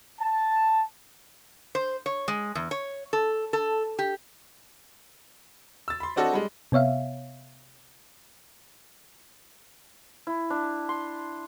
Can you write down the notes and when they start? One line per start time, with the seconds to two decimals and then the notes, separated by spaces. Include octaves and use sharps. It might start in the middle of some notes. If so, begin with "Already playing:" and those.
0.21 A5
1.75 C5
2.06 C#5
2.28 G#3
2.55 E2
2.71 C#5
3.13 A4
3.53 A4
3.99 G4
5.88 E6 A6
6.00 B5 C6
6.16 C4 D4 F#4 A4 C#5 D#5
6.33 G3 G#3
6.72 C3 B3 C#5 E5 F5
10.27 E4
10.50 D4
10.89 C6